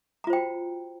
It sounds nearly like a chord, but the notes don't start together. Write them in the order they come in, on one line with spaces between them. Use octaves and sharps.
A#5 F4 C5 G5 F#4